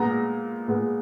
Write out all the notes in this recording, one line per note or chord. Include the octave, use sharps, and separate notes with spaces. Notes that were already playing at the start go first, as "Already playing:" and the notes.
Already playing: A#2 G#3 B3 A#5 A#6
A#2 G#3 B3